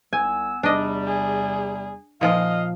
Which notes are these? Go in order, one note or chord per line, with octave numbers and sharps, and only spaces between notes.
C2 B3 G#5 E6
E2 C3 G3 D4 D#5
G#4
A#2 F3 F4 D#5 F5